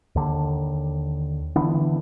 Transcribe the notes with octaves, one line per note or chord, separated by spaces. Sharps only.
D#2 D3
D3 E3 B3